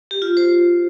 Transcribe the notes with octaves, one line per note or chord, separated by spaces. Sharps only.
G4
F4
C5